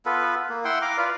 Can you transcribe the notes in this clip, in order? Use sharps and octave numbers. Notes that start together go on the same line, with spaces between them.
B3 F4 A4 B4
A#3
E4 F#5 G5 C6
F5 A#5 D6
F4 B4 D5